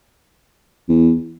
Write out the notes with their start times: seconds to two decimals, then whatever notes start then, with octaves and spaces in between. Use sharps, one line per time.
0.89 E2